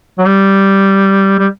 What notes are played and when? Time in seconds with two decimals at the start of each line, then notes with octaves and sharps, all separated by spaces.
0.19 F#3
0.26 G3
1.39 G3